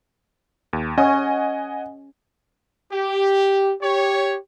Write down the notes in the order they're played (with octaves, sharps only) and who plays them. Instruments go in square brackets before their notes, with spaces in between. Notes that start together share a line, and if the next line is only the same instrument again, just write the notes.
[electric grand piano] D#2
[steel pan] C#4 [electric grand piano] D#5 F#5 G#5
[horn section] G4
G4 C#5